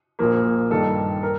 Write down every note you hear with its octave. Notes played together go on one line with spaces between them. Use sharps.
A#1 A#2 F3 A#3
G2 D#3 G3 A4
A#4